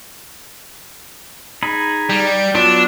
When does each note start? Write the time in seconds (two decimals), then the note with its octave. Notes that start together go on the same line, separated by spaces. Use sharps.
1.63 D#4 G#4 B5
2.10 G3
2.55 F#3 B3 D4 F4